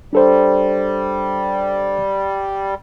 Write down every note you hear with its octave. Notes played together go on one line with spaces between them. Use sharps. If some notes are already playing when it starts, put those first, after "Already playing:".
G3 D4 A4 C5